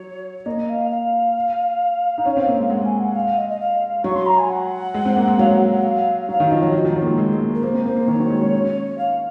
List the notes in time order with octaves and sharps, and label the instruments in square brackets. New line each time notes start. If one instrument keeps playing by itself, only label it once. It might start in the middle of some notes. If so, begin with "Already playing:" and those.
Already playing: [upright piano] F#3 [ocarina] C#5
[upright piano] A#3 [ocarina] D#5
[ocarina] F5
F5
[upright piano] D#4
C#4
C4
A#3
G#3
[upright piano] G#3 [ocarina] F#5
[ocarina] G#5
F#5
F5
D#5
D#5
F5
[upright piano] F#3 [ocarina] C#6
[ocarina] C6
A#5
G#5
F#5
[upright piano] G#3
C4
A#3
G#3
[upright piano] F#3 [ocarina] F5
[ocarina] F#5
F5
F#5
F5
[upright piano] F#3 [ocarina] F5
[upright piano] D#3
[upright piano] F3 [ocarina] D#5
[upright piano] F#3
F3
D#3
F#3
F3
A#3
G#3
G#3
G#3
A#3
[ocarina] A#4
[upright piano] A#3 [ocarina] C5
[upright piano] C4
[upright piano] A#3 [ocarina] C5
[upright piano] A#3
[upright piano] D#3 [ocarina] C#5
[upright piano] F#3
G#3
C#4
C#4
[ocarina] F5